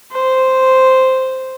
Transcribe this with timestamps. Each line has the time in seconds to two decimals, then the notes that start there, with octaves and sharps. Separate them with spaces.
0.12 C5